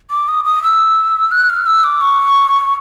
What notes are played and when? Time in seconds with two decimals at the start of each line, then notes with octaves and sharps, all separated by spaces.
0.10 D6
0.28 D#6
0.44 D#6
0.63 E6
1.31 F#6
1.49 F6
1.66 E6
1.84 D6
2.01 C#6